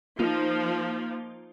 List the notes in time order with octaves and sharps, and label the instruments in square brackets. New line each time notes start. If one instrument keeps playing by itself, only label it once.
[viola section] F3 [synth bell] A#3 D#4 F4